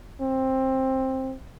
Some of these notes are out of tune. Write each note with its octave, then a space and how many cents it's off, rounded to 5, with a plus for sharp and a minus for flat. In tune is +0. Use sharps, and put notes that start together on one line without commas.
C4 +15